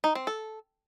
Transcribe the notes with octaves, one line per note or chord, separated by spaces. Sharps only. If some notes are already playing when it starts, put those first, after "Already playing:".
D#4
C4
A4